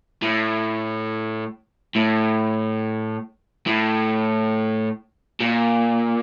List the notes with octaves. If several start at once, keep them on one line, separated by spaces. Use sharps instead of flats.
A2
A2
A2
A#2